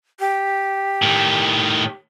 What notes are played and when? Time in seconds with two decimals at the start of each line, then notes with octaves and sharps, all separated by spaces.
0.20 G4
1.02 A2 D#3